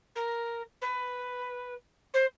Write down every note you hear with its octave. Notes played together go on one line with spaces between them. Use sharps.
A#4
B4
C5